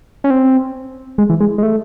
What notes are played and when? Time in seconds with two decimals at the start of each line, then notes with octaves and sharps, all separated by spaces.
0.24 C#4
0.30 C4
1.18 G#3
1.30 E3
1.40 G#3
1.58 G#3
1.63 A3